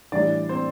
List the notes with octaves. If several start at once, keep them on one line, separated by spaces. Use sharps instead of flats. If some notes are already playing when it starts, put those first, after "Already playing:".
A2 E3 G3 D4 D5
C4 C5